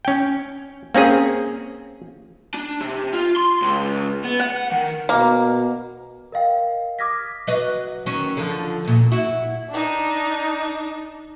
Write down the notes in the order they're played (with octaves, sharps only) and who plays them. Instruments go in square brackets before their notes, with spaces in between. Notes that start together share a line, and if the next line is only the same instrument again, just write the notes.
[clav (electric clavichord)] C#4 G5
A#3 C4 C#4 G#4
[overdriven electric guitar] D4
C3
F4
C6
C#2
B3
F#5
D#3
[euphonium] B2 [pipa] A#3
[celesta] A#4 D#5 F5 G5
D6 D#6 F6 G#6 A#6 B6
[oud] F#3 B4 D#5
D#3 F#3 C#4
D3 F3
F#2 A#2
E4 F#4
[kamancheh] D4 D#4